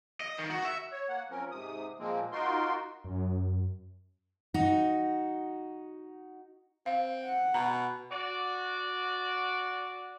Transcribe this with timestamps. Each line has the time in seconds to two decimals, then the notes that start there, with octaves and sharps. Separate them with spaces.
0.20 D#5
0.39 D#3
0.50 F#4
0.65 E5
0.92 C#5
1.09 A#3 F#5
1.30 F3 C4 C#4 A#4
1.51 G#2 C3 D#6
1.99 A#2 F3 G#3 A#3 C4
2.32 D#4 F4 F#4 A#4 C6
3.04 F#2
4.54 D#4 F#4
6.86 C4 F5
7.25 F#5
7.54 B2 A#5
8.10 F#4 D5